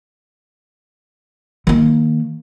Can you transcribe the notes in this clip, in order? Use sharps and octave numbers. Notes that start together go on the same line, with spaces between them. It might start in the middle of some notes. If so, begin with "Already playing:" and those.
D#3 A#3